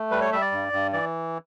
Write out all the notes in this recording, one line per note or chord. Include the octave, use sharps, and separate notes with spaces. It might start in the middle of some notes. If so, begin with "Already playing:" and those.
Already playing: A3
G3 B4
C#5
G3 E5
D5
G2
G2
E3 D5